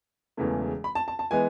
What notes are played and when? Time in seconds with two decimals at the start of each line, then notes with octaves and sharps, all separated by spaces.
0.37 E1 E2 C#3 E3 A3
0.84 B5
0.95 A5
1.08 A5
1.19 A5
1.31 E3 G#3 B3 G#5